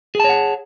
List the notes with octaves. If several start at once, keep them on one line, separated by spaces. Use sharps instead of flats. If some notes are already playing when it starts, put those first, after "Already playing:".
G#4 C#5 F#5 A5